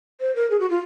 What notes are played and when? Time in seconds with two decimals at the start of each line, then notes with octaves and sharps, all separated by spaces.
0.21 C5
0.36 A#4
0.51 G#4
0.60 F#4
0.70 F4